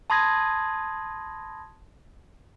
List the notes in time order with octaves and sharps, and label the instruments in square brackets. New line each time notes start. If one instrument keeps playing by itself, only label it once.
[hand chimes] A5 B5 C6 D#6 G#6 A#6